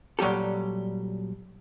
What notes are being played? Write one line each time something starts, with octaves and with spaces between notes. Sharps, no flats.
A#2 F#3 G3 G4 A4